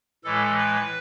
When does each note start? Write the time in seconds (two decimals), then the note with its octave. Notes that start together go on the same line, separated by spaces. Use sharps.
0.24 A2 E3 G#3 A4
0.57 B4